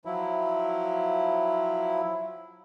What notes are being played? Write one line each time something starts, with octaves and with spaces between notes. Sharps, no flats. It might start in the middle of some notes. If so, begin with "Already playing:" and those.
F3 F#3 E4